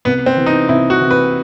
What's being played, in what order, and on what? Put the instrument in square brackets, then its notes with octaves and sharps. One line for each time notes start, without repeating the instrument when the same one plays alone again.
[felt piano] C2 [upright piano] B3
[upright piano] C4
[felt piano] C3 E3
[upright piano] D#4
[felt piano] C2 [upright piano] E4
[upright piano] F#4
[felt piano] C3 E3
[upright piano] B4